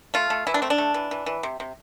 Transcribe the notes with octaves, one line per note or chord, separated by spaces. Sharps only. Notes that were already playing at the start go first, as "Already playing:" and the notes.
A3 F4
A3
E3 E4
D4
A3 C4
D4
A3
E3
E3
E3
C3
C3